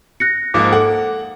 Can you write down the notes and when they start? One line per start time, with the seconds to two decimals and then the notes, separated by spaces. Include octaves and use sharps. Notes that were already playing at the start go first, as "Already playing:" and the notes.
0.20 F#6 A#6 C#7
0.54 G#2 F3 A#3 D6
0.72 A4 F#5